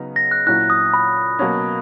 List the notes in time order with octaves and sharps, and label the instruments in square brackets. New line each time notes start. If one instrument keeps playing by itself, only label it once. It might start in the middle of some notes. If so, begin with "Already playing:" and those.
Already playing: [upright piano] C#3 F#3 B3 D#4
[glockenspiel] A#6
F#6
[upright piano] A#2 F#3 C#4 E4 [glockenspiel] F#6
[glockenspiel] D#6
B5
[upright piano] B2 F#3 A#3 C#4